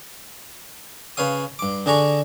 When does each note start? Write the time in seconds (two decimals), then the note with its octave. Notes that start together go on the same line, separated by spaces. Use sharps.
1.17 C#3 B4 C#5 F5 D#6
1.59 G2 D6
1.86 D3 D4 G#4 A#5 C#6